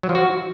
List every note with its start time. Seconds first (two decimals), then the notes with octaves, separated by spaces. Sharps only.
0.03 F#3
0.09 F3
0.15 F#4